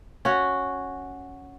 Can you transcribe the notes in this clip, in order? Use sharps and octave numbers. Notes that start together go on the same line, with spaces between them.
C#4 F#4